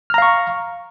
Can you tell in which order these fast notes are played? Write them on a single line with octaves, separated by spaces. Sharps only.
F6 A#5 F5 C#6